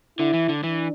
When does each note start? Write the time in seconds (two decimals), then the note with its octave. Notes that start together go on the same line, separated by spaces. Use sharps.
0.19 D3 E4
0.33 E3
0.49 D3
0.63 E3 D4